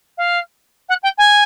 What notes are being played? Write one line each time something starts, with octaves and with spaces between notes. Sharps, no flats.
F5
F#5
G5
G#5